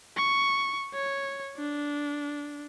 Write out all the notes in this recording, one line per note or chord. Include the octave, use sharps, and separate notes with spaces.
C#6
C#5
D4